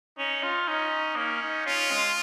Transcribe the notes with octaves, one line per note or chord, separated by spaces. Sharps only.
C#4 D#4
F4
C#4 D#4
A#3 C#4
D#4
C#4 F4
G#3